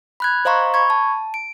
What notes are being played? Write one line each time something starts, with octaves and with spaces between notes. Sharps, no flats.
B5 F#6 G#6
C5 D#5 F5 A#5 C6 C#6
B5 C#6 G#6
A5
D7